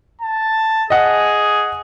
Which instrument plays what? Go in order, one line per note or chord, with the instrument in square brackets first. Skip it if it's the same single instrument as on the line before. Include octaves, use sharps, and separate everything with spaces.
[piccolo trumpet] A5
[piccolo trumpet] G#4 [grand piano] D#5 F#5 D#6